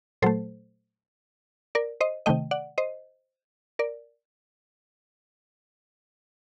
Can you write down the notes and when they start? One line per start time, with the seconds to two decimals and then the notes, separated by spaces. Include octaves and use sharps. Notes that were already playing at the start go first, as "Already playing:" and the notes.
0.22 A#2 F#3 A3 A4 C5
1.75 A#4 D5
2.01 C5 D#5
2.26 C3 D#3 A3 D#5 G5
2.51 D5 F#5
2.78 C5 D#5
3.79 A#4 D5